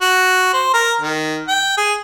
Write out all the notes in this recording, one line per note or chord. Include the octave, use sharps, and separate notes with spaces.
F#4
C5
A#4
D#3
G5
G#4